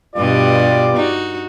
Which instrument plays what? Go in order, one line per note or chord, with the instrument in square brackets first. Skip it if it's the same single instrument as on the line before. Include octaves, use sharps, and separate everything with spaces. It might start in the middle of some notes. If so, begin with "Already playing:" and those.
[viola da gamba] G2 B2 D#5 [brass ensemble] F4 G4 D5
[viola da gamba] D#4 F#4